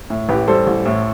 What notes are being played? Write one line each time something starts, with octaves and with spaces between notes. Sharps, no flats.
A2
A1 G4 B4
G3 A4 C5
A1
A2